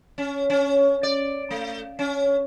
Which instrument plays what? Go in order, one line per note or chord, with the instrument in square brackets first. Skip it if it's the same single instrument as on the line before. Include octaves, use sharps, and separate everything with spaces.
[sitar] C#4
C#4
D5
A3
C#4